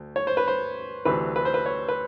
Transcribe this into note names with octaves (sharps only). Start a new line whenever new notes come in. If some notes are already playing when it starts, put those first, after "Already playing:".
Already playing: D2
C#5
C5
B4
C5
D2 C3 E3 B4
B4
C5
B4
C#5
B4